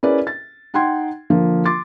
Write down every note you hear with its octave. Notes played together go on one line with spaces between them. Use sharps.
C#4 E4 G#4 A#4 B4 D5
A6
D#4 F#5 G5 C6 G#6
D3 F3 A#3
C6 D6 A6